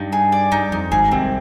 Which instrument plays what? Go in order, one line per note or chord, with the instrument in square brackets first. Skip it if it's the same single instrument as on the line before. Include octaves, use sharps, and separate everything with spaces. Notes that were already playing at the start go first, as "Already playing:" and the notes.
Already playing: [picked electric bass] G2 [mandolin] D#4
[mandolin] G#4
D5
[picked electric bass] G2 [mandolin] D#4
[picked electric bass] F2 [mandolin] D#4
[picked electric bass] G#1 G#2 [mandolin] G#4
[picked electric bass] C2 C3 [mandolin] C4